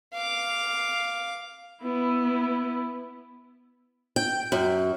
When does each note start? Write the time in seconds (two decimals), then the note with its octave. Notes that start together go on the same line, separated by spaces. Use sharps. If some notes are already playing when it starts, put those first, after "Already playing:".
0.14 F5 D6
1.83 B3 E4
4.16 G5
4.52 F#2